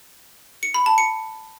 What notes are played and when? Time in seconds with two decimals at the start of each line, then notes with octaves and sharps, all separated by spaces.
0.63 C#7
0.74 B5
0.86 A5
0.98 C#7